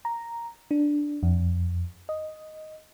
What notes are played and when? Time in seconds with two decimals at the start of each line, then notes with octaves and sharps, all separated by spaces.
0.05 A#5
0.71 D4
1.23 F2
2.09 D#5